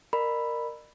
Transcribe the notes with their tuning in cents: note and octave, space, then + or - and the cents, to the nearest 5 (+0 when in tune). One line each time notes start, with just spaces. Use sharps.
A#4 +0 D5 +45 B5 +0